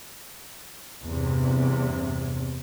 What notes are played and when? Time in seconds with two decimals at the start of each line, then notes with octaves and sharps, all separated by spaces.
1.04 E2 G2 C3